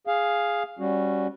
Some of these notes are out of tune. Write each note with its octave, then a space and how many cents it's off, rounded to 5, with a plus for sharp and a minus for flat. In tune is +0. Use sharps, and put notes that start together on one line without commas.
G#4 +0 F5 +0
G3 +0 C#4 -15 F#4 +0